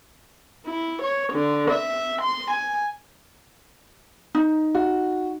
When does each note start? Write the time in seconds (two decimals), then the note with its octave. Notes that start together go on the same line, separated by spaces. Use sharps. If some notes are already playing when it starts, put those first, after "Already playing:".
0.66 E4
1.02 C#5
1.33 D3
1.71 E5
2.22 C6
2.51 G#5
4.35 D#4
4.75 F#4